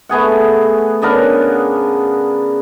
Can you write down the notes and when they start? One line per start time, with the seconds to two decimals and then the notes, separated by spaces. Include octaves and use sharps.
0.09 A3 B3 G#4 F#5
1.02 C#3 B3 D4 A#4